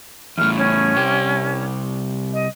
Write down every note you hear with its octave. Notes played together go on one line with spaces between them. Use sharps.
E2 A2 F6
C#4
C2 G4
D#5